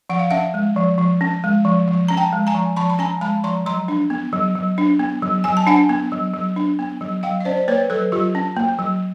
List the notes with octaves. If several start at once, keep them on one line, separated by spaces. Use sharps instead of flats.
F3 F#5
F5
C#4 E5 F#5
G#3
F3
F3
C#4
G#3
F3
F3
C#4 A#5
G5 A5
G#3
G#5 A#5
F3
F3 A5 B5
B5
C#4 G#5 A#5
G#3 A5 B5
F3 A#5 C6
F#3 A#5 C6
D4
B3
F#3
F#3
D4
B3
F#3
F#3 G#5
A5
D4 F#5 G#5
B3
F#3
F#3
D4
B3
F#3
F#3 F5 G5
D#5
C#4 C5 D5
D5
A#3 B4 C#5
F#3 A4 B4
F#3 F4 G4
C#4
A#3
F#3